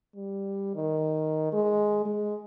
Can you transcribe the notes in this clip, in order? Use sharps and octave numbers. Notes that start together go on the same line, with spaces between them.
G3
D#3
G#3
G#3